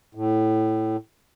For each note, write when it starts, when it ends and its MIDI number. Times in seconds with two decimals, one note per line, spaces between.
0.15 0.97 45